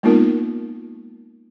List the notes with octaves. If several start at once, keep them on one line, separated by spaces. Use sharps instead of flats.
G#3 A#3 B3 D#4 F4 A#4